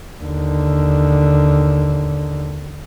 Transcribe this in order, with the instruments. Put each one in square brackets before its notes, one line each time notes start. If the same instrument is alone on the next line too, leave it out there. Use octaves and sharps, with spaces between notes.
[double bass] D#2 D3